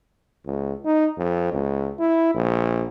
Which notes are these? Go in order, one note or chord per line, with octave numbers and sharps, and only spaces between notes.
C#2
D#4
F2
C#2
E4
A#1